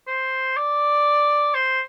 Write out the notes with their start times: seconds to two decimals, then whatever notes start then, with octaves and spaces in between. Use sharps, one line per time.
0.07 C5
0.57 D5
1.55 C5